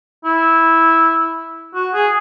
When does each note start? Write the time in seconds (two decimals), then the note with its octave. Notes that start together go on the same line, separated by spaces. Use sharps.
0.25 E4
1.75 F#4
1.94 G#4